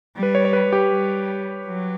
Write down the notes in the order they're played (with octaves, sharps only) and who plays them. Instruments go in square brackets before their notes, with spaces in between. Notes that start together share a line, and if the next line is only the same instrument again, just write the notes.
[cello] G3
[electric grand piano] B4
C#5
C#5
B4
G4
[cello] G3
F#3